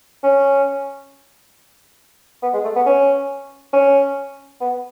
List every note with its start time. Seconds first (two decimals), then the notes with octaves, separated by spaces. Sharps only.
0.23 C#4
2.43 B3
2.54 G#3
2.64 A3
2.76 B3
2.86 C#4
3.73 C#4
4.61 B3